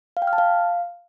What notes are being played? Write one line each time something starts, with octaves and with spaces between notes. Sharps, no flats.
F5
G5
F6
A5
F5